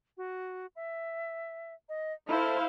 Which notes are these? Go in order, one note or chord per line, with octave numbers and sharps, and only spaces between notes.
F#4
E5
D#5
E4 A4 C5 F5